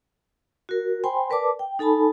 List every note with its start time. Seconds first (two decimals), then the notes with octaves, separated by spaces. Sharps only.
0.69 F#4 A#4
1.04 C5 G5 G#5 B5 C6
1.30 A#4 B4 D5 A5 D6
1.59 G5
1.79 D#4 A4 G#5 A5 B5